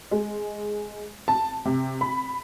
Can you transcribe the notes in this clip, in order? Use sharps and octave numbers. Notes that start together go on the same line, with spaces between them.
G#3
A5
C3
B5